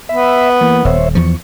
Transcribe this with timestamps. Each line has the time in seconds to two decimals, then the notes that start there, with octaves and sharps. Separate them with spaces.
0.09 B3 E5 B5
0.61 E3 A#3
0.85 D#1 C5 C#5 E5
1.15 E2 F3 C#6